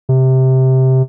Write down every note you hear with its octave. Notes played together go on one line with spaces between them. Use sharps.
C3